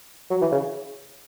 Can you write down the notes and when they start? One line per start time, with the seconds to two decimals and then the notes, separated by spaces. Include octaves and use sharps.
0.30 F#3
0.41 E3
0.52 C#3